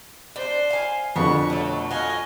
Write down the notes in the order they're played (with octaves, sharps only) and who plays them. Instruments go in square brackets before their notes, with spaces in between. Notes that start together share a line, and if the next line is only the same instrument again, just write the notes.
[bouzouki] D4 [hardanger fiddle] C5
[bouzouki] F5 G#5
[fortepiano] F2 D3 [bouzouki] B3 [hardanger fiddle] C#6
[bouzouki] B2 F#3 [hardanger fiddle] A3
[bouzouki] F#4 F5 [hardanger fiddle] D#5 G#5